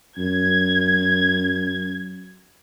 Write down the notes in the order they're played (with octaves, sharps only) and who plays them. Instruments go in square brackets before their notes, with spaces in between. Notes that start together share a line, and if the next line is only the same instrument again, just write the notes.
[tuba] F#2 [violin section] G#6